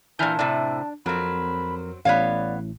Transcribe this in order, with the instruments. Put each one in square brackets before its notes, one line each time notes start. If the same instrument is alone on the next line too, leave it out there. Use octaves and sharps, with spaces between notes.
[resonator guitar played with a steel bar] A#2 E3 [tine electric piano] D4 F6 G6 [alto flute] A5
[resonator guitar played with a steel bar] A2 C3 [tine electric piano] D4
[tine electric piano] F2 A#4 [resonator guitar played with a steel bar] F#3 C4 [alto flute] B5
[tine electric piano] A1 A2 [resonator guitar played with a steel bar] B3 C#5 F5 [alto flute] D5